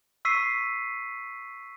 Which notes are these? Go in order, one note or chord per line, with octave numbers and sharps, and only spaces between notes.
C#6 E6 B6 C7 D#7